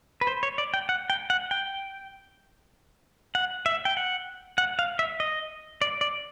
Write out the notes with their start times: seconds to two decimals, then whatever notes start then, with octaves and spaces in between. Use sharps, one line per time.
0.21 B4
0.27 C5
0.43 C#5
0.58 D5
0.74 G5
0.89 F#5
1.10 G5
1.30 F#5
1.51 G5
3.35 F#5
3.66 E5
3.85 G5
3.97 F#5
4.58 F#5
4.79 F5
4.99 E5
5.20 D#5
5.82 D5
6.01 D5